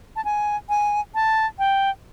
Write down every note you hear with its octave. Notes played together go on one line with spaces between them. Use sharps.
A5
G#5
G#5
A5
G5